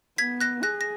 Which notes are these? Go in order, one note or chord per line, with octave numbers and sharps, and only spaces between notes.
B3 G#6 B6
F#6 A#6
G#4 F#6 A#6
A#6